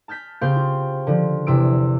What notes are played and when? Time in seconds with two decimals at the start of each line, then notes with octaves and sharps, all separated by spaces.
0.08 A5 F6 G6 B6
0.41 C#3 C4 G4 C5 F5 G6
0.56 F4
1.07 D3 F3
1.47 E2 C3 E6 D7